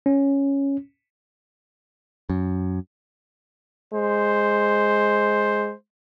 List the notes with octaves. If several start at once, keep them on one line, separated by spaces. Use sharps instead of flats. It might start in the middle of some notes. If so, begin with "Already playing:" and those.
C#4
F#2
G#3 C5